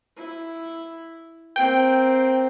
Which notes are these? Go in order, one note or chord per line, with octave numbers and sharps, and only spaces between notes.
E4
A#3 C4 G5